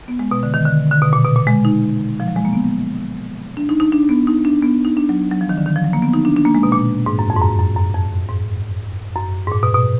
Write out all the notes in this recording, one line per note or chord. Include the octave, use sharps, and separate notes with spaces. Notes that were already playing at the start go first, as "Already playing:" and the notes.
B3
G#3
B2
D3
D#3
D3
D3
B2
A#2
B2
A#2
G#3
D#4
F3
F#3
G#3
A#3
B3
D4
D#4
D#4
D4
B3
D#4
D4
B3
D#4
D4
F#3
F#3
F3
D#3
D3
D#3
F3
F#3
A#3
B3
D#4
D4
D4
A#3
G#3
B2
A#2
G#2
F#2
F2
G#2
F#2
F#2
F#2
F2
G#2
F#2
G#2
A#2
B2
B2